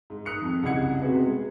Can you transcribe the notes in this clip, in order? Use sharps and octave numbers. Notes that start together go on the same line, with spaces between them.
G#2
D#6 F#6 C#7 F7
F2
C2 C#3 D#5 F#5 G#6 C#7
C3 B3 F#4 G#4 B4
G#3